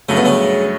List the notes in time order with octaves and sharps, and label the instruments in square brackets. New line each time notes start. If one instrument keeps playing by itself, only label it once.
[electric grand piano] G2 F#3 A3 [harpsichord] C#3
[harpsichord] B2
C#3